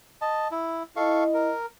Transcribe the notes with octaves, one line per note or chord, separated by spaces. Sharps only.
D#5 A5
E4
E4 A4 D#5 F5 C#6
A#4